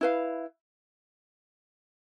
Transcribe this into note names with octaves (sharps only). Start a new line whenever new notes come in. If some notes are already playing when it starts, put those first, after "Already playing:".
E4 B4 F5